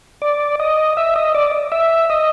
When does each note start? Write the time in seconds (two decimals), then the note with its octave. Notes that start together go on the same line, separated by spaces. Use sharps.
0.22 D5
0.60 D#5
0.97 E5
1.16 D#5
1.35 D5
1.72 E5
2.10 D#5